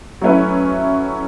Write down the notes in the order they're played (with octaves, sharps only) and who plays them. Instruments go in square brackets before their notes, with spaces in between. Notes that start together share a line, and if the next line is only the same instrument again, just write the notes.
[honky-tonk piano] F#3 A3 C#4 E4 B4